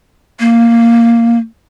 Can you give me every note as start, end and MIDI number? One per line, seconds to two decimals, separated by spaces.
0.40 1.38 58